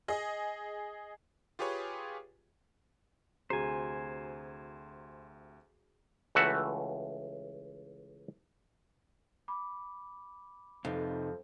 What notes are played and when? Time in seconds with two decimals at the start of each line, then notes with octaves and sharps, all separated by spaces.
0.08 G#4 D#5
1.59 F4 G4 G#4 B4 C#5
3.50 D2 C3 F#4 G#4 C5 G#5 A#5
6.35 C#2 E3 A3 F#4 E5 F#5
9.48 B5 D6
10.85 F2 C3 D#4